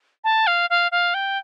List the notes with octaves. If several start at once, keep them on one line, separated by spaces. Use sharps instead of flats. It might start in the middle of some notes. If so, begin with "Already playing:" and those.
A5
F5
F5
F5
G5